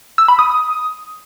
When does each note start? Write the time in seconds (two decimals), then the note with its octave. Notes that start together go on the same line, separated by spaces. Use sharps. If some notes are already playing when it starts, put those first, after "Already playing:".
0.18 E6
0.28 B5
0.39 D#6